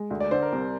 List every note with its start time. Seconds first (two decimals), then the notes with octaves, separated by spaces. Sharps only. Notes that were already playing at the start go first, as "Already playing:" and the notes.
Already playing: G#3
0.10 D2
0.20 D5
0.31 D3 C5
0.42 A#4
0.52 C2